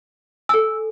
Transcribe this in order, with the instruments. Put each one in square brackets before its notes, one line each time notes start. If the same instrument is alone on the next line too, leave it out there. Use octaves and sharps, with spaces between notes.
[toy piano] A4 G#5 [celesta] E6